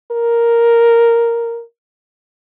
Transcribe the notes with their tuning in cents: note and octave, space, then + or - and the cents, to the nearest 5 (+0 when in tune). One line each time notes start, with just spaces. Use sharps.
A#4 +0